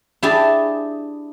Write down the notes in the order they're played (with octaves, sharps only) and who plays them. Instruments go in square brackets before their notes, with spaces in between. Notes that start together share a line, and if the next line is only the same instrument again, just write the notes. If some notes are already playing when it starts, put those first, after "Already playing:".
[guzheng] D4 E4 G4 G#4 A5